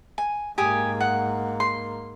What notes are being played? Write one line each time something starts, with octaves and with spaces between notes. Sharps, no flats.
G#5
G#2 A#3 G4 G#5 D#6
F#5
C6